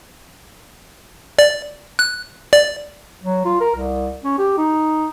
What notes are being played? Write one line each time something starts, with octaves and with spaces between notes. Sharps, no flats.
D5
F#6
D5
F#3
F4
A#4
C2
C#4
G4
D#4